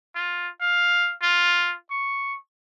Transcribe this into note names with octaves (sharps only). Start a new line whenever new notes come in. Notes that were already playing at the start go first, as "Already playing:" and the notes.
F4
F5
F4
C#6